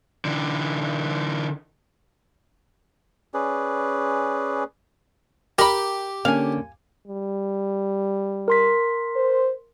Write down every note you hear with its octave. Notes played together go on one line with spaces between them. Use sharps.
D3 E3
C#4 G#4 B4 D5
G4 A#4 B5
D3 A#3 C#4 F5 G#5
G3
A#4 C6 B6
C5